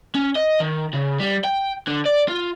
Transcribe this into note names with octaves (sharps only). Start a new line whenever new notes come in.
C#4
D#5
D#3
C#3
G3
G5
D3
D5
F4